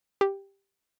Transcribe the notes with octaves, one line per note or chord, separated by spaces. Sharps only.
G4